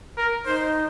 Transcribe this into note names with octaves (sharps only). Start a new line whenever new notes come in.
A#4
D#4 C5